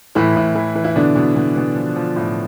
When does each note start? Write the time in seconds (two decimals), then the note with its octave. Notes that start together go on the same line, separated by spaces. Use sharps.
0.15 A2 E3 E4
0.36 A2
0.55 E3
0.75 E3
0.84 E4
0.96 B2 D3 D4
1.16 B2
1.36 B2
1.56 B2
1.76 F3
1.96 F3
2.16 A2